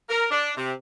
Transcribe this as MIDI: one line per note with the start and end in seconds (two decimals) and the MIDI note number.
0.09 0.26 70
0.30 0.51 62
0.57 0.71 48